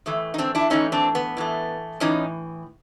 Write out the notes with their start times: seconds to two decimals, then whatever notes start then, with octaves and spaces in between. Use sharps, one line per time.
0.06 A2 E3 A3
0.34 D#4
0.38 C4 D4
0.55 D4 E4
0.70 A2 E3 A3 C#4 D#4
0.92 C4 D4
1.15 B3
1.37 A2 E3 A3
2.00 A2 E3 C#4 D#4